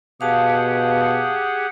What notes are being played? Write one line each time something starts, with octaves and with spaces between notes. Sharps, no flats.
B2 G4 G#4 F5 F#5 A5